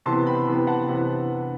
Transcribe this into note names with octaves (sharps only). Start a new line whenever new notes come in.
C3 E3 B3 A5 C6
G5 B5
C3 E3 B3
F#5 A5
C3 E3 B3